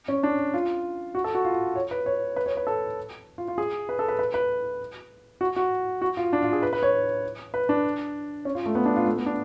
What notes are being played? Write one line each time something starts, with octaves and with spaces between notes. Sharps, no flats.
C#4
D4
F4
F#4
A4
F#4
F4
C#5
B4
C#5
B4
C#5
B4
A4
F4
F4
G#4
B4
A4
B4
B4
B4
F#4
F#4
F#4
F4
D4
F4
G#4
B4
B4
C#5
B4
D4
C#4
F4
A3
B3
D4
F4
A3
B3
D4